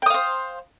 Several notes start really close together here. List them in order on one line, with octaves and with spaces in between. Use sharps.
G5 D#6 F5 C5